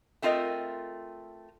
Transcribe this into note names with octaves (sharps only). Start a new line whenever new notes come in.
A3 C4 F4 A#4 D#5